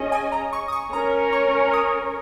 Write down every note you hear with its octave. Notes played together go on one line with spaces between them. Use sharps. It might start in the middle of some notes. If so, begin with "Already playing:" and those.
Already playing: C#4 G#4 D#5
G#5
A#5
C#6
D#6
C#6
C#4 A#4 C#5 A#5
C#6
D#6